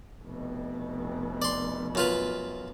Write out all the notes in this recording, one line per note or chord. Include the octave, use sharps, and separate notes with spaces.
F1 B2
D5 C6
F#2 F4 B4